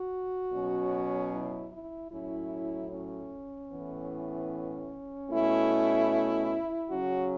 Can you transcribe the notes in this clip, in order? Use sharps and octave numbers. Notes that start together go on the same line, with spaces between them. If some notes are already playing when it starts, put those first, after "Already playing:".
Already playing: F#4
B2 F#3 C#4
E4
E4
A2 F#3 C#4 E4
C#4
A2 E3 B3
B2 A3 C#4 E4
C#3 F#3 C#4 F#4